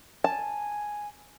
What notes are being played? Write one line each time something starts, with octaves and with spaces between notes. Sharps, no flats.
G#5 A5